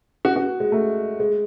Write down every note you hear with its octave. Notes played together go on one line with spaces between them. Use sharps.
F#4
F#4
G#3
A3
G#3